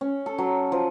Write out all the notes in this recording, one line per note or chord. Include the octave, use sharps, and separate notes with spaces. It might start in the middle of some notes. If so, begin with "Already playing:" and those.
C#4
A4
F#3
F3